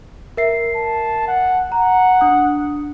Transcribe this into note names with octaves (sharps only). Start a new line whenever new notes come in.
A#4 E5 C7
A5
F#5
F#5 A#5
D4 D#6